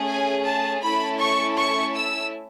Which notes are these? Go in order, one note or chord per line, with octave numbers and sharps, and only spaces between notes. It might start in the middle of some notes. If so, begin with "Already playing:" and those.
Already playing: A3 C#4 G#4
G#5
A5
A3 C#4 E4 A4 B5
C#6
C#6
E6